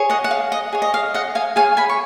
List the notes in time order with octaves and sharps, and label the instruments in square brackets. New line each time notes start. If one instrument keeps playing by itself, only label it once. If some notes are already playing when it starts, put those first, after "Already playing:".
Already playing: [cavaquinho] G#4 C#5
D#5 F#5
F#5
F5
D#5
G#4 C#5
D#5
F5
D#5 F#5
F5 G#5
G#4 C#5 F5 G#5
G#5 B5
C#6